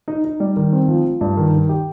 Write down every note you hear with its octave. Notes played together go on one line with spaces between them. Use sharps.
D#4
D#4
G3
D#3
C4
F3
F3
G2
D#3
D#3
G4